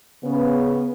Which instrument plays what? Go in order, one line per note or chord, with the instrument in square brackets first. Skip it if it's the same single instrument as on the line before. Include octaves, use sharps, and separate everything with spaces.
[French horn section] C#3 B3